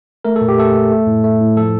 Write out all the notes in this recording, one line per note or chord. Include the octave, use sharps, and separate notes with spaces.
A3 A#4
A4
A#2
G4
A3 A4
A3
A3
A2
A3
A2
F3 A4